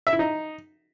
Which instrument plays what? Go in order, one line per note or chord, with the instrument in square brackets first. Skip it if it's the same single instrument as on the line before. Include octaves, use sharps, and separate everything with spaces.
[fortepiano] E5
E4
D#4